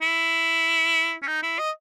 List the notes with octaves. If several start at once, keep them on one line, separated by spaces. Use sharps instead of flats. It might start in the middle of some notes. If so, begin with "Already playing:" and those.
E4
C#4
D#4
E4
D#5